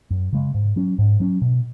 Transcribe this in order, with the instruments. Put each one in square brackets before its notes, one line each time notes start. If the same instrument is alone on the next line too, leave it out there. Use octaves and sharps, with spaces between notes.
[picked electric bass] F#2
C#3 G#3
G#2
F#3 C#4
G#2
F#3 C#4
B2